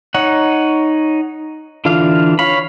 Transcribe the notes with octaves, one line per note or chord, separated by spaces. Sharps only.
D#4 C#5 F#5
D3 E3 D4 F4 F5
C#5 F5 B5